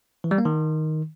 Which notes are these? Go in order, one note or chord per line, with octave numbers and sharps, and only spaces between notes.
E3
G3
A#3
D#3